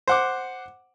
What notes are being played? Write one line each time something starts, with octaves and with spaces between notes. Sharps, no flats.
C5 F#5 D6